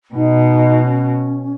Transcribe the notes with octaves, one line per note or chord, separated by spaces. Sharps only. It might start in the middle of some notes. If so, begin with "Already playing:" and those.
B2 D#4
C#4